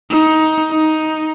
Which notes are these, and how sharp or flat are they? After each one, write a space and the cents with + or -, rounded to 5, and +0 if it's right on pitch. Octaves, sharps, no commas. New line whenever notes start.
D#4 +15
D#4 +10